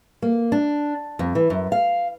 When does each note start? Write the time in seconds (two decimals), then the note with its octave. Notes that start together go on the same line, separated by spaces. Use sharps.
0.22 A#3
0.52 D4
1.19 F2
1.35 E3
1.50 F#2
1.72 F5